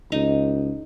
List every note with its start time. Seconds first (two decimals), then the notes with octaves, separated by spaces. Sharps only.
0.12 C#2 D#4